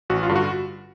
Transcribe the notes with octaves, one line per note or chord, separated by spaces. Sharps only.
A1 F#4
F4
G2 D3
F#4